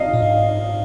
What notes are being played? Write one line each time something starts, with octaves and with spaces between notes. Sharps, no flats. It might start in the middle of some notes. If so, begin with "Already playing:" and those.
Already playing: D#5 F5
A#2
G#2